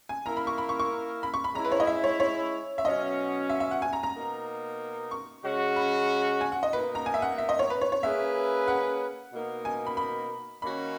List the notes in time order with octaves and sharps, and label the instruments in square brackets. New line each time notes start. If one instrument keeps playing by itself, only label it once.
[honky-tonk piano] G#5
[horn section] A#3 E4 A#4 [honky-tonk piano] A#5
[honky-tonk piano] B5
C#6
B5
C#6
C#6
B5
C#6
B5
[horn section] G#3 C#4 E4 [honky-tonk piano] A#5
[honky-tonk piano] B4
C#5
D#5
E5
C#5
C#5
E5
[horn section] B2 F#3 C#4 F#4 [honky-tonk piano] D#5
[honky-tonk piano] E5
E5
F#5
G#5
A#5
A#5
[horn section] B2 A#3 D#4
[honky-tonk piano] C#6
[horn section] C#3 G#3 C#4 F#4
[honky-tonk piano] B5
G#5
F#5
D#5
[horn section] B2 A#3 D#4 [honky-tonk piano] B4
[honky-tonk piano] A#5
G#5
E5
F#5
E5
D#5
C#5
B4
C#5
C#5
[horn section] A#3 C#4 G#4 B4 [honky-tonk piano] E5
[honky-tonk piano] F#5
[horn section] B2 A#3 D#4
[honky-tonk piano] G#5
B5
B5
[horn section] D#3 A#3 C#4 F#4 [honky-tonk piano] B5